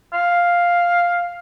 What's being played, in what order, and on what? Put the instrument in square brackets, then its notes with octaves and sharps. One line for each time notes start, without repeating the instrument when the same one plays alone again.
[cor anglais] F5